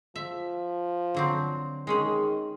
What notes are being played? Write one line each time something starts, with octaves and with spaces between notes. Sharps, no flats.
F3 E5
D3 F#3 C4
D#3 G#3 C#4 G#4